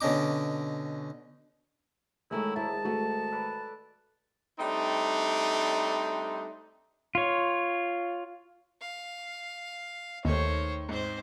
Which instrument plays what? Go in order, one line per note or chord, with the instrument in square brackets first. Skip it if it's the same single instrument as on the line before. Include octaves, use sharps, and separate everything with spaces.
[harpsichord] B2 D3 C#4 D#4 D6
[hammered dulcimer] D#3 F#3 [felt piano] G#3 A3 [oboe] E4
[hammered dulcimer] G#2 [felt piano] E4 [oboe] A5
[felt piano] A3 F#4
[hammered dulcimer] A4 B4 D5
[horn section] G3 A3 C4 D4 D#4
[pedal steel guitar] F4 C#5
[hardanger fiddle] F5
[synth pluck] D#2 [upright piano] D#3 A3 [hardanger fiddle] C5 C#5
[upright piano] G#2 [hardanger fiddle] C4 C5